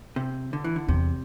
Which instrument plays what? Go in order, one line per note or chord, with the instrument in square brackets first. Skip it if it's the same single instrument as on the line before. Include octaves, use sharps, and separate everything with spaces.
[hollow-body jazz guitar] C3
D3
E3
D3
[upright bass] E2 [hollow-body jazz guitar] C3